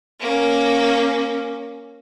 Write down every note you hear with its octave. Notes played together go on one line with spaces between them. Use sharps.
A#3 C#4